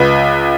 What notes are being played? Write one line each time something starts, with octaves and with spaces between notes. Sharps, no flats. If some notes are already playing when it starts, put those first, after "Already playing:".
Already playing: C#2 B4